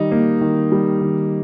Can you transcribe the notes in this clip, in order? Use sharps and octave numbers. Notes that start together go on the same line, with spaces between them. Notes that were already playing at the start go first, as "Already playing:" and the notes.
Already playing: D#3 G3 D#4
A#3
D#3
G3
D#3